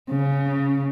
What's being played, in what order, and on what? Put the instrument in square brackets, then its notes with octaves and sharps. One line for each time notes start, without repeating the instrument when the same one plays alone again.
[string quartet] C#3